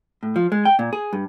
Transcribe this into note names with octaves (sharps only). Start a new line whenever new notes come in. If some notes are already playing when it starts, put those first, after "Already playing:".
A2
F3
G#3
G5
A#2
G#4
G2